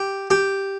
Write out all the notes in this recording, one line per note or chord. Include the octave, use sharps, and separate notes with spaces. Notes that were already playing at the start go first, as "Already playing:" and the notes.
Already playing: G4
G4